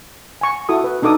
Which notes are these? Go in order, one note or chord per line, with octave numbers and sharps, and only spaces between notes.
G#5 C#6
E4 F#4 A4 D#6
B4
D4 D#4 A4 D6 D#6